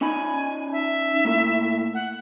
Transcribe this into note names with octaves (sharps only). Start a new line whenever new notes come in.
C#4 D#4 G#5 B5
E5
A2 A#3
F#5